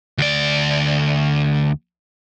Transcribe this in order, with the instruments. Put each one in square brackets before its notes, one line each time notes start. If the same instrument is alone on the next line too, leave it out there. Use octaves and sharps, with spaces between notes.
[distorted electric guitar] D2 D5